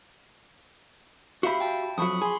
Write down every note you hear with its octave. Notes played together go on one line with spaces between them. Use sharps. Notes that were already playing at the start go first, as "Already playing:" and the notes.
F#4 G4 E5 F5 B5
G5 A5
F2 F#3 B5 C#6 D#6
G#4 B5 C6